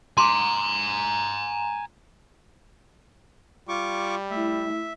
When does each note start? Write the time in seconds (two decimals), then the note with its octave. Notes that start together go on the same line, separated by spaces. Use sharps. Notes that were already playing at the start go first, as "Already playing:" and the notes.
0.18 G#5 A#5 C6 D6
3.69 G3 F4 C#6 D6
4.31 A3 E4 E5